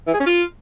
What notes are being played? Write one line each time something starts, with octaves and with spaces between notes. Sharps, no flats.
E3
G#4
C#4
F4